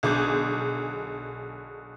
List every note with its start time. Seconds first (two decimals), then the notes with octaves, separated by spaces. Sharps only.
0.03 B1 D3 G#4 D6 G6